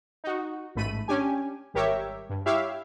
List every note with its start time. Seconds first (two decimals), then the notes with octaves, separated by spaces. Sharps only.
0.24 D#4 F#4
0.75 A1 G#2 A3 B5 D#7
1.08 C#4 D4 G4 G#5
1.74 G#1 G3 G4 A#4 C#5 E5
2.29 G2
2.46 E4 G4 C#5 E5 F5